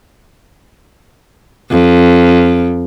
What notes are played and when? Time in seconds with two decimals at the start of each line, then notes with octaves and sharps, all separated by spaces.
1.70 F2